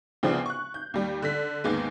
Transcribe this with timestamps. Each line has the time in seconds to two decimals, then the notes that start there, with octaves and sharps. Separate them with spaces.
0.23 D2 C#3 F3 B3 C4 D4
0.46 C#6 F#6
0.74 G6
0.94 D#2 G3
1.22 D3 B6
1.64 D#2 G#2 G#3 B3